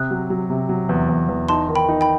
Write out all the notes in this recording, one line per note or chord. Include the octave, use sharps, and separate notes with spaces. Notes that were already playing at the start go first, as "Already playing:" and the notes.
Already playing: C3 D#6 F#6
F#3
F#3
C3
F#3
E2
E2
E2
D#4 A5 C6
D#3
G5 B5
D#4
G5 B5